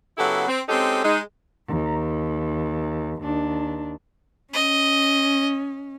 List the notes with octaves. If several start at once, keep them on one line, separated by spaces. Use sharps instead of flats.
C#3 F#3 B3 E4 G4 A4
C4
G#3 C4 C#4 D#4 G4 A4
G#3 D#4
D#2
D#2 D4
C#4 D#5